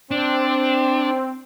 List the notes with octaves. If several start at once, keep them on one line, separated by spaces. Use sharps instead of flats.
C4 D4